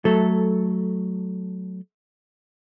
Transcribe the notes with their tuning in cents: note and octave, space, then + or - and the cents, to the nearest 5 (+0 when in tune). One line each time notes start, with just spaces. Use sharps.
F#3 +0 A3 -10 A4 +0